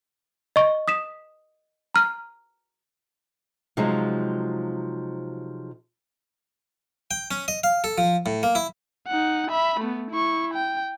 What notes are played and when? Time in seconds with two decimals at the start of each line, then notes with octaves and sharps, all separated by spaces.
0.56 D#5 C#6
0.88 D#6 B6 E7
1.95 A#5 F6
3.77 C3 F3 F#3 G#3 D#4
7.11 G5
7.31 C#4
7.48 D#5
7.64 F5
7.84 A4
7.98 F3
8.26 A2
8.43 A#3
8.55 E4
9.08 D#4 F#5
9.51 E5 B5
9.80 A3 B3
10.11 E4 C#6
10.54 G5